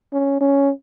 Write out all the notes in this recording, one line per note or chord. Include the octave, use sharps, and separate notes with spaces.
C#4
C#4